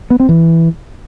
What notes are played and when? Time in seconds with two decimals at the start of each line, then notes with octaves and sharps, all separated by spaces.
0.10 B3
0.20 C4
0.29 E3